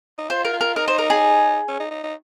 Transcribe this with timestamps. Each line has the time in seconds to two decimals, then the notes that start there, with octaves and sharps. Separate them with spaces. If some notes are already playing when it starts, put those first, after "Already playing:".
0.18 D#4
0.29 F4 C5
0.45 A#4
0.53 F4
0.61 A#4
0.75 D#4 A#4
0.88 C5
0.99 A#4
1.10 G#4
1.68 C#4
1.80 D#4
1.91 D#4
2.03 D#4